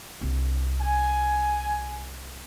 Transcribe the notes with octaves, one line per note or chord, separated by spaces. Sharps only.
C2 D4
G#5